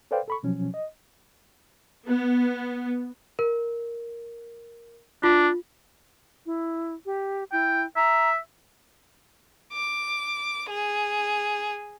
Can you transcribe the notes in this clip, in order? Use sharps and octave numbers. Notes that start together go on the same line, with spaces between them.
A4 B4 C5 D5 F5 G5
A4 B5 C#6
B2 F3 F#3 C#4
D#5
B3
A#4
D4 F4
E4
G4
E4 G5
E5 A#5
D6
G#4